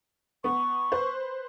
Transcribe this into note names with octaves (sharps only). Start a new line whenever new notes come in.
B3 C#6
B4 C5